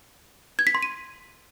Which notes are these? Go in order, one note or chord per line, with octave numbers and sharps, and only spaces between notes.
G#6
B6
C6
D#7